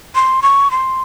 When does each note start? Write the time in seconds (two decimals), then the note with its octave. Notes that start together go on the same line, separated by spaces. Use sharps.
0.15 C6
0.42 C#6
0.71 C6